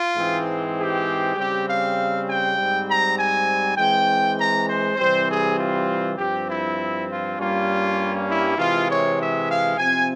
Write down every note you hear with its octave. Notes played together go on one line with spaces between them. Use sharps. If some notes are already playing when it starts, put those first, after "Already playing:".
Already playing: F4
G#2 E3 G#3 C4
G4
C#3 G3 C4 G4
F5
G5
G#2 G3 C4
A#5
G#5
E3 G#3 C4 G5
A#5
C5
C3 E3 G3 C4 C5
G#4
F4
G2 F3 C4 G4
E4
F4
G2 G3 A#3 C#4 F4
E4
C3 E3 G#3 F4
C#5
E5
F5
C3 F3 C4 G#5